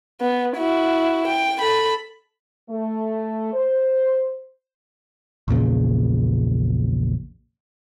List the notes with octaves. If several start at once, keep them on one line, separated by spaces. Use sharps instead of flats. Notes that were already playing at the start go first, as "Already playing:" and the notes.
B3
E4 F#4
G5
A4 B5
A3
C5
A#1 E2 A#2 C#3